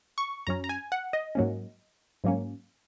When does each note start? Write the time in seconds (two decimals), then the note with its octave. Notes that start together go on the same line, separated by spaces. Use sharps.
0.18 C#6
0.47 F#2 F#3 C#4 A#5
0.64 A#5
0.69 G#5
0.92 F#5
1.13 D#5
1.35 G#2 F#3 A#3 C#4
2.24 G#2 F#3 A#3 C#4